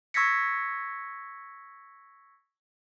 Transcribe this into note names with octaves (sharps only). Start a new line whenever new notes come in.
C#6 E6 G#6 A#6 B6 C#7